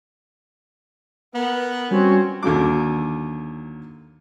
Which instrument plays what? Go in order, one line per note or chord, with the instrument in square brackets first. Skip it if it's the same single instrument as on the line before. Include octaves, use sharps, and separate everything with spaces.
[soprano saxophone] B3 [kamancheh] A#4
[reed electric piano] G3 [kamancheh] C4 C#4 [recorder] F#4
[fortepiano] D#2 D3 F#3 D6